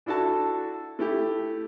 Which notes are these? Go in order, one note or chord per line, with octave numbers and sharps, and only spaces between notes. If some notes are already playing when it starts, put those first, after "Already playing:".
D4 E4 F#4 A4 A5
A3 E4 G4